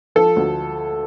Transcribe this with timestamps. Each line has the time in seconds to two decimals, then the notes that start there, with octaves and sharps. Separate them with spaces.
0.15 F3 A4
0.36 D2